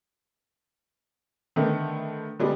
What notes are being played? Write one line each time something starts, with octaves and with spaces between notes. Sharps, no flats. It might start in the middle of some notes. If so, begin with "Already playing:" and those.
D3 D#3 A3 B3
D3 G3 G#3 B3